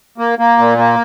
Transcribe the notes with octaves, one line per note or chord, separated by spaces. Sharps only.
A#3
A#3
A#2
A#3